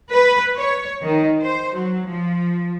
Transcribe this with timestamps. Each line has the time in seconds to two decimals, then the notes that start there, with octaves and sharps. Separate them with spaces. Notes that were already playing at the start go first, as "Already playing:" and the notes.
0.11 B4
0.57 C#5
1.03 D#3
1.41 C5
1.74 F#3
2.08 F3